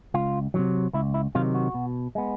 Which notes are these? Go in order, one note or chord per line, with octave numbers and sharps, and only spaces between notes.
C#2 F4
C3 D#3 F#3
C#2 E4
E4
C3 D#3 F#3 F4
F#4
B2
G#3 B3